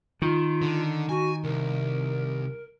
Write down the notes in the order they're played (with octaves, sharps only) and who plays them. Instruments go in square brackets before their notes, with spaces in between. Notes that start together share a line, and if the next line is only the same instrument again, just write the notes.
[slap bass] D#3 [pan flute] F4
[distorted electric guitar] D3
[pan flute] F#4 [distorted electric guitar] G#5
[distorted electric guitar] C2 [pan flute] A#4